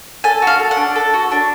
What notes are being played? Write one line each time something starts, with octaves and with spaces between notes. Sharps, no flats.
A4 G#5
F#4
F5
A4
F#5
D4
A4
F#4
D4